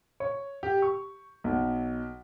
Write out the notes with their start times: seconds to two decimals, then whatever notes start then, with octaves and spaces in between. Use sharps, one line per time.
0.20 C#5
0.63 G4
0.82 C#6
1.44 B1